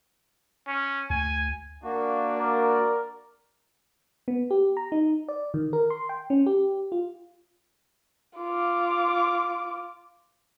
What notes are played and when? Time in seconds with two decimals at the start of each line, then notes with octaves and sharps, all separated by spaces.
0.67 C#4
1.10 D2 G#5
1.83 A#3 D4 F#4
2.37 A#4 D5
4.28 B3
4.51 G4
4.77 A#5
4.92 D#4
5.28 D5
5.54 D#3
5.73 A#4
5.90 C6
6.09 G5
6.30 C#4
6.46 G4
6.92 F4
8.38 F4 D6